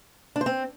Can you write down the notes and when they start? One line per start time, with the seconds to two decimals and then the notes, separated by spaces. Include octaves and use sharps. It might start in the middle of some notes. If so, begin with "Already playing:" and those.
0.36 D4
0.41 C5
0.46 C4